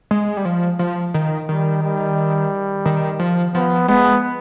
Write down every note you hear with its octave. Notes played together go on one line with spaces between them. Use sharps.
G#3
G3
F3
F3
D#3
D#3 G3
G3
D#3
F3
F3 B3
G#3 B3